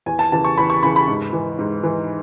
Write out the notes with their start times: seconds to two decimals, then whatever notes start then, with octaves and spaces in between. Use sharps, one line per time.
0.06 E2 G#5
0.19 A5
0.32 C#3 E3 A5
0.44 C#6
0.57 E2 B5
0.70 C#6
0.83 C#3 E3 B5
0.96 B5
1.08 G#2
1.33 E3
1.59 G#2
1.84 E3